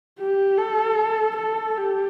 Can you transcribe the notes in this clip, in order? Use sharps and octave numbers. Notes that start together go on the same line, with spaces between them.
G4
A4
A4
G4